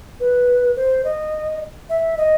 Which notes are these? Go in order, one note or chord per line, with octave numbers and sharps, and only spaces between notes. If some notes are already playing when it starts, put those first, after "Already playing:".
B4
C5
D#5
E5
D#5